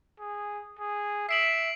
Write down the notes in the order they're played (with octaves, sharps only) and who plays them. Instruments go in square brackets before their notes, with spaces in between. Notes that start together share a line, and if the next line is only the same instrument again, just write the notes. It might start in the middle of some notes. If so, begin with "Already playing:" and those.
[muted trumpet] G#4
G#4
[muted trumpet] E5 [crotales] C7 D7 F#7